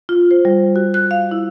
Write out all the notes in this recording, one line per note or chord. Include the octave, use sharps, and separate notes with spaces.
F4
C5
G3
F#4
F#6
F5
E4